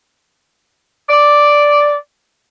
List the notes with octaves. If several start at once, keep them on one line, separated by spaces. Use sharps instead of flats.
D5